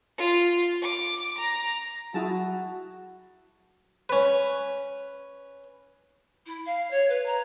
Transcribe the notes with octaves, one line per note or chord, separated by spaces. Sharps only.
F4
D6
A#5
F#3 E4 F#4 G#4 A5
C#4 B4
E4
F5
C#5
B4
A#5